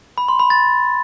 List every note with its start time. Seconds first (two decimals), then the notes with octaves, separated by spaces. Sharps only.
0.18 B5
0.28 C6
0.39 B5
0.50 A6